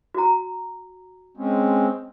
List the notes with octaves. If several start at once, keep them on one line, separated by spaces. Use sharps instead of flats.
F#4 A#5
G#3 C4 C#4